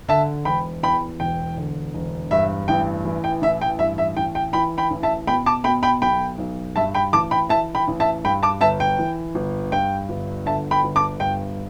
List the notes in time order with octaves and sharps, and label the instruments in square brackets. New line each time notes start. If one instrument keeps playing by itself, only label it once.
[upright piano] D3 E5 A5
E1 G5 B5
E2 G5 B5
E1 G5
D3
E1
G2 E5
A1 G5
E3
G5
A1 E5
G5
G2 E5
E5
A1 G5
G5
E3 G5 B5
G5 B5
A1
E5 A5
B2 G5 B5
A5 D6
B2 G5 B5
G5 B5
B1 G5 B5
B1
G2 E5 A5
G5 B5
A1 A5 D6
G5 B5
E3 E5 A5
G5 B5
A1
E5 A5
G2 G5 B5
A5 D6
G1 E5 A5
G5
E3
G1
G2 G5
G1
D3 E5 A5
G5 B5
G1
A5 D6
G2 G5